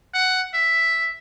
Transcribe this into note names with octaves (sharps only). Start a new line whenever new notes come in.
F#5
E5